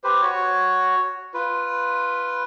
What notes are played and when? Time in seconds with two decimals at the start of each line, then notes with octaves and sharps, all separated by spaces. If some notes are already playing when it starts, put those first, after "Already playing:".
0.04 G4 B4 C5
0.22 F#4 C#5
1.34 F4 B4